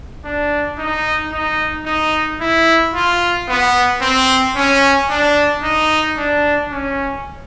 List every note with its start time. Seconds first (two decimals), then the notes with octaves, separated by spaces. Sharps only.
0.25 D4
0.78 D#4
1.33 D#4
1.86 D#4
2.41 E4
2.94 F4
3.48 B3
4.01 C4
4.56 C#4
5.10 D4
5.63 D#4
6.17 D4
6.71 C#4